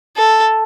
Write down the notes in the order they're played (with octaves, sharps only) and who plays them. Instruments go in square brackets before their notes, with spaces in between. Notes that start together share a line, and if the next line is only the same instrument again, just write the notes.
[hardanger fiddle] A4